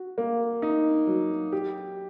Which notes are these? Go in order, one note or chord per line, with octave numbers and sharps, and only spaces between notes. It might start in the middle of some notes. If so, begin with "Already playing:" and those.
Already playing: F#4
A#3
D#4
F#3
G4